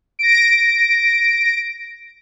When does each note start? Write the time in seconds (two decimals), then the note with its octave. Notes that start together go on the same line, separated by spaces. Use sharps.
0.19 A#6 D7